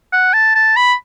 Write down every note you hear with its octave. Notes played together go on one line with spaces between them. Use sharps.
F#5
A5
A5
B5